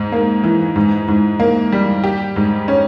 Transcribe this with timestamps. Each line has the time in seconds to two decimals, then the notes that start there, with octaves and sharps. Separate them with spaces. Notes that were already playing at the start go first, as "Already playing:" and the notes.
Already playing: G#2
0.12 A#3
0.44 E3
0.76 G#2
1.08 G#2
1.40 A#3
1.72 G3
2.04 G4
2.36 G#2
2.68 C#4